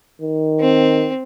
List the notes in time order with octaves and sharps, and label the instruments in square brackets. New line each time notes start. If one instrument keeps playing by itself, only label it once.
[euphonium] D#3
[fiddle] C4